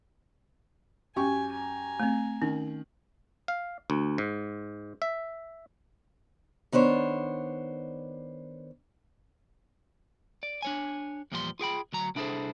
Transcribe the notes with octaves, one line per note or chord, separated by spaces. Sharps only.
F#2 G4 G#5 C#6
G#5 A#5
A3 C4
D#3 C#4
F5
D2
G#2
E5
D#3 B3 D4 C5 C#5
D5
D4 C#5 G#5
E2 A#2 F3 G3 F#4 C6
F4 G#4 G5 B5
D2 F#3 A#5
C2 D4 E4 G#4 A4 C5